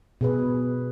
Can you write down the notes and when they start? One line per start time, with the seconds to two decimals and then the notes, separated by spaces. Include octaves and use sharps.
0.21 B2 G#4 B4